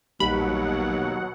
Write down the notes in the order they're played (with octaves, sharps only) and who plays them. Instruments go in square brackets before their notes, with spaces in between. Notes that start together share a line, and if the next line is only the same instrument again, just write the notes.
[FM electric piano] A#1 G3 [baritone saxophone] D#2 [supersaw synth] B2 F#3 F#5 [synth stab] B5